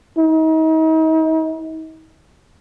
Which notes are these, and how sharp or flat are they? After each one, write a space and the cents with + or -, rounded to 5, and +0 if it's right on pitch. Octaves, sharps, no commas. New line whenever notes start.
D#4 +40